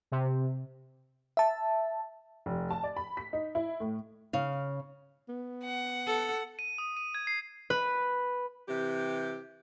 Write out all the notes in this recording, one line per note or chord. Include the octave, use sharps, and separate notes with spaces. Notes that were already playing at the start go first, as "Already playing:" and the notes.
C3
E5 A5
F1
A5
D5
B5
B6
D#4
E4
A2
C#3 F5
B3
F#5
A4
D#7
D#6
D#7
G#6
C7
B4
C3 E3 G4